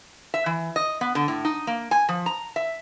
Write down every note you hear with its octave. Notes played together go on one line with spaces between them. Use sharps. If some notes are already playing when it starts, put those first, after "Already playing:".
E5
E3
D#5
B3
D3
A2
D#4
A#3
G#5
F3
A#5
E5